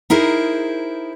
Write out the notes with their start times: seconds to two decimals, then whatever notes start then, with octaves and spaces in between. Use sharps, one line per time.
0.10 D#4 E4 G#4 A#4 C5